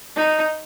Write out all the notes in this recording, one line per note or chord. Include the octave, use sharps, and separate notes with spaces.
D#4